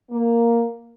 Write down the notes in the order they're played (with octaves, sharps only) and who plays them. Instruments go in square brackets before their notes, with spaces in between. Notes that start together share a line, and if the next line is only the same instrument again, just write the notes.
[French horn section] A#3